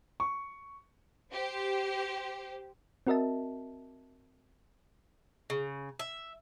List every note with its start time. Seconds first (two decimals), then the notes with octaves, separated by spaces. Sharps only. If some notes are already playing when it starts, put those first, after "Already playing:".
0.20 C#6
1.32 G4 C5
3.07 C4 F#4 A#4 D#5 E5 A5
5.50 C#3
5.99 E5